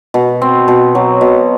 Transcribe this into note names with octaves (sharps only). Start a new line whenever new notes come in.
B2
C4
B2
F#3
B2